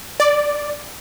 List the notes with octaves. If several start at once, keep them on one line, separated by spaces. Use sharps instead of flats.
D5